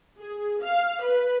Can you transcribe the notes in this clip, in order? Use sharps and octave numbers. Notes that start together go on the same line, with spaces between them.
G#4
F5
B4